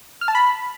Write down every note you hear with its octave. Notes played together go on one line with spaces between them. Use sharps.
F6
A5
B5